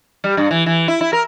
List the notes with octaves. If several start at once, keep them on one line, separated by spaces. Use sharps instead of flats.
G3
G2
E3
E3
E4
E4
A#4